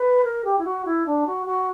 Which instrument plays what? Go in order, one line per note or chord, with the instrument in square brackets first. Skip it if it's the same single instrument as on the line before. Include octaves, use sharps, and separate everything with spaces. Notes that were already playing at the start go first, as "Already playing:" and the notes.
Already playing: [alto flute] B4
A#4
G4
E4
F#4
E4
D4
F#4
F#4